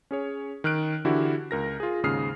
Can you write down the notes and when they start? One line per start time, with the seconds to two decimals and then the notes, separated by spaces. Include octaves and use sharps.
0.11 C#4 G#4 C#5
0.64 D#3 F6 F#6 D7
1.05 D3 E3 E4 F#4 G4
1.51 C#2 A#4 A#6
1.80 F4 G#4
2.03 D#2 G#2 C#3 D#6 F6 C7